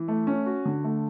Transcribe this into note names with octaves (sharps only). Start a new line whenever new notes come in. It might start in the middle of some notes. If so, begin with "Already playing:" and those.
Already playing: E3
A3
C#4
F#4
D3
A3